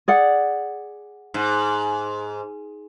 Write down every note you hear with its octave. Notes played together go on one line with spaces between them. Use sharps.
G#4 D5 F#5
G#2